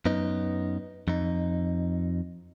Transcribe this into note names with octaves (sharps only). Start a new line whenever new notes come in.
F#2 B3 D#4
F2 D#4